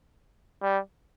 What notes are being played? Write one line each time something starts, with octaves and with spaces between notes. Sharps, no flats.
G3